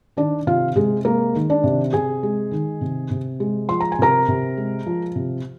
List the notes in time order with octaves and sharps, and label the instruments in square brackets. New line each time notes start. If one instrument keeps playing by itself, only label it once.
[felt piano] D#3 D4 D5
C3 F4 F5
C3 G#3 G#4
G#3 A#3 A#4
D#3
D4 D5
C3
C3 G#4 G#5
G#3
D#3
C3
C3
G#3
F3 C6
A#5
G#5
C3 A#4 A#5
C3
G#3
F3
C3